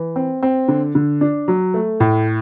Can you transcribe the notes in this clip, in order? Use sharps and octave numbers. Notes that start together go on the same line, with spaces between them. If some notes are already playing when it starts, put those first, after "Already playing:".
Already playing: E3
C4
C4
D3
D3
D4
F#3
A3
A2